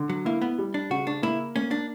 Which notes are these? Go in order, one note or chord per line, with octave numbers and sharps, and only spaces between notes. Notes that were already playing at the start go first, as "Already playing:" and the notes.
Already playing: D3
F#3
A#3 E4
B3
G3
D4
C#3 F#4
D4
A#3 E4
A#3 C#4
D4